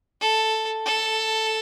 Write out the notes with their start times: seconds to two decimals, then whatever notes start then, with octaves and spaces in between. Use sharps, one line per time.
0.21 A4
0.86 A4